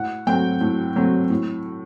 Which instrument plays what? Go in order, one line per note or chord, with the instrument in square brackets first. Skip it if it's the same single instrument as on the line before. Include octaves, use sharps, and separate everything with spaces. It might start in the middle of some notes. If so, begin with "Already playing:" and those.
Already playing: [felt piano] A2 F#5
F#3 A3 C4 G5
A2
F#3 A3 C4
A2